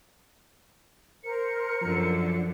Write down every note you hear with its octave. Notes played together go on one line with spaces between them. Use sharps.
A#4 C5 C#7
F#2 D3 F3